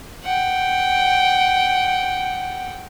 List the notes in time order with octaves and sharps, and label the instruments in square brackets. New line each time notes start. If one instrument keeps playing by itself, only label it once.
[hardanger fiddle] F#5 G5